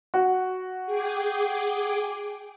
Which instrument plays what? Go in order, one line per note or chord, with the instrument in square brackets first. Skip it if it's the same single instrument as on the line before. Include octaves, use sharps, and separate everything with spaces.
[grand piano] F#4
[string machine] G#4 G5 D6